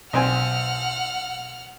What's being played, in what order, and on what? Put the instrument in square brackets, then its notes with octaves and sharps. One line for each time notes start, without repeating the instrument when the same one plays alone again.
[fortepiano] B1 C4 G#5 [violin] F#5 F6